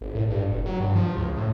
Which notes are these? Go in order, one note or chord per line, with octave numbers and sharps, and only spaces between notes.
G#1
A2
G2
F#1
F#3
G2
F3
C#2
A2